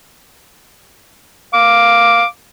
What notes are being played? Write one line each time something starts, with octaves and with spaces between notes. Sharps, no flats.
F5 D6